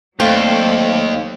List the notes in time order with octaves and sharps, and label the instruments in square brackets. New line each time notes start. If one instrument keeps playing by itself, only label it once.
[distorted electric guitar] D#2 [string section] F#3 A4 D5 [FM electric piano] A3 F5 [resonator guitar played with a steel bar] C4